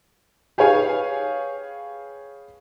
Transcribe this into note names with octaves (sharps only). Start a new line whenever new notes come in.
G4 G#4 B4 C#5 F5 G#5